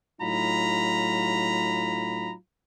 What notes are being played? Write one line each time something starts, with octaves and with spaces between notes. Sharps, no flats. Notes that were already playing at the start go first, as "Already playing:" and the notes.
A2 F#3 D#4 F4 A#5 B5